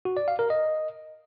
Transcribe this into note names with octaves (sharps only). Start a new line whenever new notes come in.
F#4
D5
F5
A#4
D#5